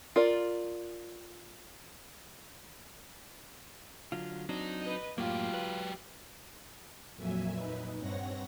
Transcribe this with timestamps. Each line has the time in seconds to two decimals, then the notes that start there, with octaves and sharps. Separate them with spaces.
0.16 F4 A#4 D5
4.12 D3 F#3 F4
4.49 F#3 C4 D4 D#4
4.81 B4 D#5
5.18 F#2 A2 F#3 A#3 F4 G4
5.54 B4
7.16 F2 A#2 F#3 E5 G#5
7.54 D#4 B4
7.99 G2 C4 C#5 F#5 A#6